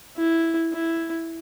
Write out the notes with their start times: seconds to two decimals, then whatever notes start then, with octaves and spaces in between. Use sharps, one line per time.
0.17 E4
0.72 E4